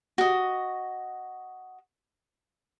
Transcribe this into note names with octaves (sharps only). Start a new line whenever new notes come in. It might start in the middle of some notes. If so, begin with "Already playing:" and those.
F#4 D#5